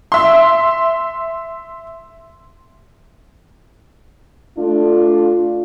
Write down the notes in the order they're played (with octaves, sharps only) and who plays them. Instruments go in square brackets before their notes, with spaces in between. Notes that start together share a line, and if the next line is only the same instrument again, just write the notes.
[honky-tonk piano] E5 C6
[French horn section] A3 D4 F4